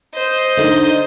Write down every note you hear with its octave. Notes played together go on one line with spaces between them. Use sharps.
C5 D#5
D3 D#4